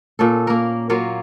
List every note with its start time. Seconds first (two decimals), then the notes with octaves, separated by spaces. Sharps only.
0.19 A#2 C#4 A4
0.47 A#3 A#4
0.90 F#3 A#3 F4 C#5